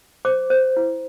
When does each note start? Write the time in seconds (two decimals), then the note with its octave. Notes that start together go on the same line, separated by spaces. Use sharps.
0.25 C5 D6
0.50 C5
0.77 E4